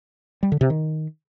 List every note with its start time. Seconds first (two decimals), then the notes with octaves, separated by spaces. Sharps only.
0.43 G3
0.52 D3
0.61 C3
0.70 D#3